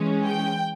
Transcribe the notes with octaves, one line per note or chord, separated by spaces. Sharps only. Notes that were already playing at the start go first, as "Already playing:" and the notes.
Already playing: E3 G#3 C#4
G5